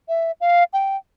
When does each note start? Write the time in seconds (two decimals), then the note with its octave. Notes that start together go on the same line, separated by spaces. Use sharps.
0.09 E5
0.41 F5
0.73 G5